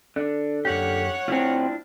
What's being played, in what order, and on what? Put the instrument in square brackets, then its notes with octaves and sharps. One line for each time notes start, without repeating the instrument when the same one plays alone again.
[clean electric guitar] D3 [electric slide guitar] D4
[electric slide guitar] F#2 A#3 G4 [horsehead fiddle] C#5 F#5
[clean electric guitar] D2 C4 [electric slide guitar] D4 E4 F4